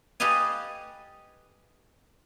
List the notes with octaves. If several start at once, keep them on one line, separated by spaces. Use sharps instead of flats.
G4 A4 B4 D#5 F5 G#5